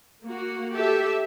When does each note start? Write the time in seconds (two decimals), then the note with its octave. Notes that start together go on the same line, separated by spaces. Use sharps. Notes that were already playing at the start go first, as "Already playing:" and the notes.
0.24 A#3 F#4
0.74 G4 A4 E5